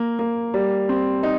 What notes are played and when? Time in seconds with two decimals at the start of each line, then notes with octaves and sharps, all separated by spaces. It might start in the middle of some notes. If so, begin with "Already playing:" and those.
Already playing: A#3
0.19 A#3
0.54 G3
0.89 C4
1.23 D#4